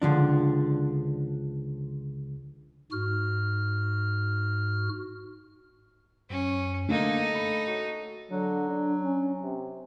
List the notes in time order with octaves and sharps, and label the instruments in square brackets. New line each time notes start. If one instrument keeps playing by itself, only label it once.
[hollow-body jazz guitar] C#2 D3 F3 D4
[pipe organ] G#2 F#4 F6
[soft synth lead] F#2 [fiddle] C#4
[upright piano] D3 A#3 [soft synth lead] A3 [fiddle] D#4 A4
[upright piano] B5
F#4 C#5
[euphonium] D3 [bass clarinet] F#3
[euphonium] D4
C#4
C3